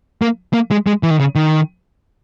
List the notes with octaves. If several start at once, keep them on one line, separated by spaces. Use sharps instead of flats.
A#3
A#3
G#3
G#3
E3
D#3
C#3
D#3